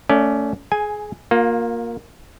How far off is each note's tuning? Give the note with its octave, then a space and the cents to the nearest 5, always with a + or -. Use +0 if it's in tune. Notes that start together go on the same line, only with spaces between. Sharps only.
A3 +20 C#4 +20 D5 +0
G#4 +20 G#5 +0
A#3 +0 F4 +35